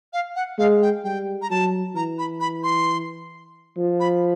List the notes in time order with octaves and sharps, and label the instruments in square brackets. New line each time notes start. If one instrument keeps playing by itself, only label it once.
[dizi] F5
F#5
[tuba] G#3 [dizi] F5
[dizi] G5
[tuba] G3 [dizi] G5
[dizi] A#5
[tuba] F#3 [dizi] A5
[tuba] E3 [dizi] A#5
[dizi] B5
B5
C6
[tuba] F3
[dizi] B5